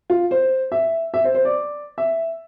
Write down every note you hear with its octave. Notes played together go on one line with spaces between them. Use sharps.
F4
C5
E5
E5
C5
C5
D5
E5